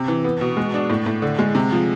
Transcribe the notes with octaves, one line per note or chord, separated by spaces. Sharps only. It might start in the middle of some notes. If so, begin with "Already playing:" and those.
Already playing: C3
E3
B3
B2
G#3
D4
A2
A2
D3
G#3
C3
F3